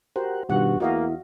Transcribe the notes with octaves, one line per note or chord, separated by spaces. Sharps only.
F#4 G4 A#4 C5 F#5
G2 B2 D#3 G3 F4 F#4 F#5
E2 A#3 E4 F#4 D#5 F5